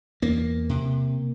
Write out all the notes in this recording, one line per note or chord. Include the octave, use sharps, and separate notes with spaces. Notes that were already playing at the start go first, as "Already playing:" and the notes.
E2 A#3
C3